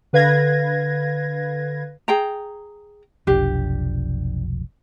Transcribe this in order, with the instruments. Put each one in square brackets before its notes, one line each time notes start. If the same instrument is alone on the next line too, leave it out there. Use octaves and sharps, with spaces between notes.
[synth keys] D3 B4 F5 G#6 A#6
[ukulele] G#4 G5 A#5
[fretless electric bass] F1 B1 F3 [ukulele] D4 G4